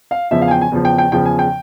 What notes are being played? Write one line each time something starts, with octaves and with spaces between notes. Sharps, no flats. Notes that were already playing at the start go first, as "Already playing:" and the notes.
F5
E2 C#3 F3 E5
F5
G#5
G5
G#5
E2 C#3 F3
G5
G5
E2 C#3 F3 G5
G#5
G5